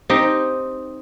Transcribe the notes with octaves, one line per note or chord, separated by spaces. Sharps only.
C4 D#4 G4